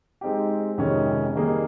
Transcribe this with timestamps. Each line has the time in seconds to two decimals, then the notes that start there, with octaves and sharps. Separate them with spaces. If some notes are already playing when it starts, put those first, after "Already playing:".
0.21 G#3 C4 D#4 G4
0.78 F2 C3 D#3 G#3 C#4
1.35 D#3 G3 A#3 D#4 G#4